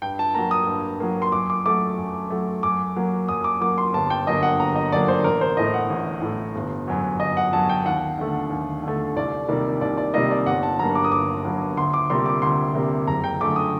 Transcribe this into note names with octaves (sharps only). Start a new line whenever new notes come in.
G2 G5
A5
F#3 A#3 A#5
D#6
G2
F#3 A#3
C6
F#2 D6
D6
F#3 A3 D6
F#2
F#3 A3
F#2 D6
F#3 A#3
F#2 D#6
D6
F#3 A#3 D6
C6
G1 A5
G5
F#2 D3 F#3 A#3 D#5
F#5
G1 A#5
D#5
F#2 D3 F#3 A#3 D5
C5
A1 A#4
C5
A2 A3 D#5
F#5
A1
A2 A3
G1
F#2 F#3
G1 D#5
F#5
F#2 F#3 A5
G5
D#2 F#5
D3 A3
D#2
D3 A3
C2 D5
C3 D#3 G3 A#3
C2 D5
D5
C3 D#3 G3 A#3 D#5
D5
G1 F#5
A5
G2 F#3 A#3 A#5
D6
D#6
G1 D6
G2 F#3 A#3
D2 C6
D6
C3 G3 A#3 C6
D6
D2 C6
C3 G3 A#3
F#1 A#5
G5
F#2 D3 A3 D6
D#6